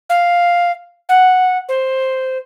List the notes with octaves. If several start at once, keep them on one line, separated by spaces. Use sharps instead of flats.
F5
F#5
C5